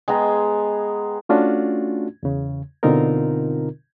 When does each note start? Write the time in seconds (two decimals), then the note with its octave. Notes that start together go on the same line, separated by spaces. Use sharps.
0.08 G#3 B3 G5 A#5
1.29 A3 C#4 D4 F4 F#4
2.23 E2 C#3
2.83 B2 D3 C4 D#4 F4 A#4